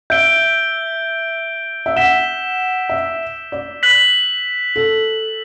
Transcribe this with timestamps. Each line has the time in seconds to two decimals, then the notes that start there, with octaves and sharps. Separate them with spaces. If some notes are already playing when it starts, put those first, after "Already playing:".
0.10 E5 G6 D7 G7
1.86 E5
1.96 F#5 E6 B6 E7 G7
2.89 E5
3.52 D5
3.83 F#6 B6 F#7
4.76 A4